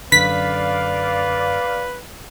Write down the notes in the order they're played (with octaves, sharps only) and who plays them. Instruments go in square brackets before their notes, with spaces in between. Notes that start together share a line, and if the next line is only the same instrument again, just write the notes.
[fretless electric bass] F#2 D3 [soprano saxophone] B4 [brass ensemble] D5 F5 [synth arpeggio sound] B6